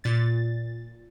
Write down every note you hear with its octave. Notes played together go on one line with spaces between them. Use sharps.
A#2 A6